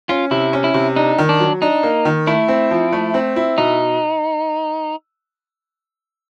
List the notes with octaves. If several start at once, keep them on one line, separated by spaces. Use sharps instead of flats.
C#4 F4
C3 E4
C#4
E4
C3
D4 D#4
D#3
D4
F#3
D4 D#4
A#3
D#3
A3 E4
C4
F3
A3
C4
E4
B2 D#4